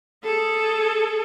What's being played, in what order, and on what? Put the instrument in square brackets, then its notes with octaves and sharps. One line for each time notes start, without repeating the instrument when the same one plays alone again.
[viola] G#4 A4